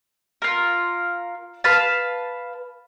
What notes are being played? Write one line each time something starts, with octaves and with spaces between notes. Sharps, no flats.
F4 A#4
B4 F5 A5